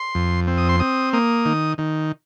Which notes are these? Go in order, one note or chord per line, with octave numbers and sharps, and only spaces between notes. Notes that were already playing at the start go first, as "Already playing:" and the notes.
Already playing: C6
F2
C4
D#6
C6
C4 D#6
A#3 D#6
D#3
D#3